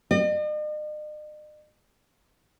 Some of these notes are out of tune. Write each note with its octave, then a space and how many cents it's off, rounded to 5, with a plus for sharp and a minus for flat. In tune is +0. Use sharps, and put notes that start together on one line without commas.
D#5 -45